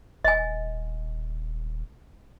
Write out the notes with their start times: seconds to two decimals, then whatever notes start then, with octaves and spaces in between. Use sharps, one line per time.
0.24 D#1 D#5 G#5